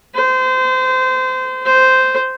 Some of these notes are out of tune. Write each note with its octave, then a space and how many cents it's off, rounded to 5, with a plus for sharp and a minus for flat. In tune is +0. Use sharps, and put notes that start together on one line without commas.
C5 -25
C5 -10